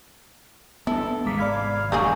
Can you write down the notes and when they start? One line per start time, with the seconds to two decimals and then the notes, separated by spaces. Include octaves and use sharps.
0.87 B3 D4 E4 A4
1.26 G#1 C3 G#3 A#3 D6 B6
1.39 D5 F5 B5 G#6
1.92 E1 D3 F#3 A#3 G#4 F5 C#6 G6